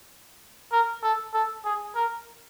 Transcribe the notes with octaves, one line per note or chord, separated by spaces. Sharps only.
A#4
A4
A4
G#4
A#4